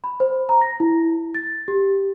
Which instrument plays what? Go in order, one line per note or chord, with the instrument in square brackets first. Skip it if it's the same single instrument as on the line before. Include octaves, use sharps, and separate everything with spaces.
[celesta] B5
C5
A#5
A#6
E4
A6
G4